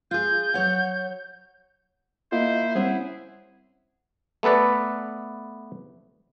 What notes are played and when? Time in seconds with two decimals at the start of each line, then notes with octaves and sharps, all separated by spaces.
0.11 F4 G#4 G6
0.54 F#3 C#5 F#5
2.32 A#3 E4 F4 C5 D#5 F5
2.75 G3 C4 C#4 G#4 C5 E5 F#5
4.43 A3 B3 A4 B4 D5